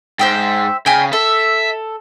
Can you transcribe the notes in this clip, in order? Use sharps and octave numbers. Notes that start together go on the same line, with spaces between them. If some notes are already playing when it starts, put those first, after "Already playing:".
G#2 C5 E5 G5
C#3 G5 G#5
A4 E5